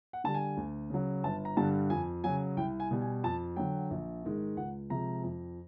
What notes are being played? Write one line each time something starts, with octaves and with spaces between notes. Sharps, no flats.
F#5
D3 G3 A5
G#5
D2
C#3 F#3
G1 A5
A#5
G2 D3 G3 A5
F2 G#5
C#3 F#3 G#5
C2 G5
G#5
B2 G3
G#5
F2 A5
D3 F#3 G5
A#1
G#2 D#3 G#3
C#2 F#5
C3 F3 G#3 A#5
F2